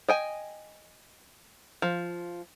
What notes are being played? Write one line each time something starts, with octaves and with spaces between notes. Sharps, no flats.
D#5 G5 G#5
F3